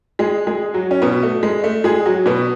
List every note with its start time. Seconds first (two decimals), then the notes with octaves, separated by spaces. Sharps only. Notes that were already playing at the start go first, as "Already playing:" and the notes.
0.19 G#3 G#4
0.47 G#3 G#4
0.74 F#3 F#4
0.91 C#4
1.02 B2 B3
1.23 A3
1.43 G#3
1.64 A3
1.84 G#3 G#4
2.05 F#3 F#4
2.26 B2 B3